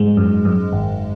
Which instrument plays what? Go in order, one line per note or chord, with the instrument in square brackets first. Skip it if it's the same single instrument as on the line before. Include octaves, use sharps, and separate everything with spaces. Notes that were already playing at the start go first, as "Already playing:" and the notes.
Already playing: [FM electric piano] G#2 G#3
F#2
F#2
G#1